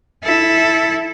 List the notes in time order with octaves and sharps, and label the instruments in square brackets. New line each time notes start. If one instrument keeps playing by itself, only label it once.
[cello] E4 A4